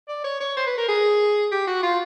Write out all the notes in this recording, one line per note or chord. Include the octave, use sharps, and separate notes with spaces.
D5
C#5
C#5
C5
B4
A#4
G#4
G4
F#4
F4